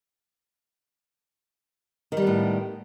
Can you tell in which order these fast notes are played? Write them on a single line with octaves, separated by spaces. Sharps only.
D#3 G3 B3 A2